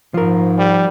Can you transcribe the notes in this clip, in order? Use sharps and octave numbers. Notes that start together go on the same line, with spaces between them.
G#2 F3 A#4
G3